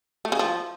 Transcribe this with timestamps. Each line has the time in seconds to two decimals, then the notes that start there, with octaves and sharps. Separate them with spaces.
0.25 A3
0.32 C#3
0.39 F3